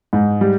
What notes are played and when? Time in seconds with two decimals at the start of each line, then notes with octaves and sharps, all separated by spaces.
0.13 G#2
0.41 G3